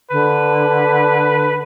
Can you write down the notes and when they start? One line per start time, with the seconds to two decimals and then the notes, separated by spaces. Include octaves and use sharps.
0.11 D3 B4